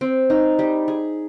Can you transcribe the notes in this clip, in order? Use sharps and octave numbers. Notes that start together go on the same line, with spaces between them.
C4
D#4
G3
G#4